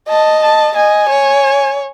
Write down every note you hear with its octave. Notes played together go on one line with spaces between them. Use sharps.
D#5 A5
A5
D#5 G#5
C#5